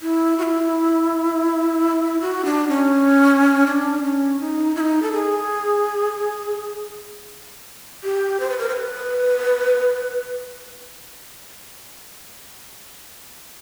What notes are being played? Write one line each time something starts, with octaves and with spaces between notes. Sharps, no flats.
E4
F#4
E4
F#4
D4
C#4
D4
D4
C#4
D#4
E4
D#4
A4
G#4
G4
C5
B4
A#4
C5
B4